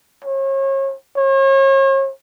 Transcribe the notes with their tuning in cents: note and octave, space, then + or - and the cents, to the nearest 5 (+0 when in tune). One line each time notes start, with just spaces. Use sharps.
C#5 -35
C#5 -40